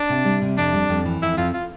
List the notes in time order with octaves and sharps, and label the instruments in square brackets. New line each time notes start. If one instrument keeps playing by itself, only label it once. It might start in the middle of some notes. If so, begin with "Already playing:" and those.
Already playing: [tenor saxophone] D4
[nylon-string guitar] C3
G3
C3
[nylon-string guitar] F2 [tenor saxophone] D4
[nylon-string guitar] G3
F2
E3
[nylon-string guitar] F2 [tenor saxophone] E4
[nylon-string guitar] F2 [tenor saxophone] F4
[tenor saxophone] F4